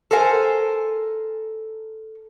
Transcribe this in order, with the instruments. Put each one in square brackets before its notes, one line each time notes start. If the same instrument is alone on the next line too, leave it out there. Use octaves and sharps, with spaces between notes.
[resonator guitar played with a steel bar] A4 A#4 C5 F5 G#5